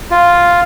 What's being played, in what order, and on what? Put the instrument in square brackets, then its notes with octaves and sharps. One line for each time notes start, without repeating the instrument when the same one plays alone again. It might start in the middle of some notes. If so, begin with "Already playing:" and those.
[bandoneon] F4